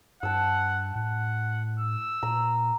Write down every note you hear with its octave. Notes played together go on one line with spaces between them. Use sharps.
G2 F#5 A5 E6
A2 F#5
E6
A#2 A#5